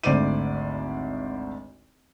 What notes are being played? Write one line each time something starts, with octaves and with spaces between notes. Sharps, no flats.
G#1 D2 C5 D5 D6 D#7